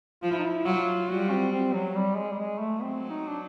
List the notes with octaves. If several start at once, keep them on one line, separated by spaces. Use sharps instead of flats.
F3 F4
E4
D#4
E4
F#3 F4
G3 F#4
C4
C4
F#3
G3
G#3
G3
G#3
A3
F#3 C4
D#4
D4